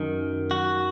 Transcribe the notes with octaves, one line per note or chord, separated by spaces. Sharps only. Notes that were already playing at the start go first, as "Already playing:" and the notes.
Already playing: F#2 D#3
F#4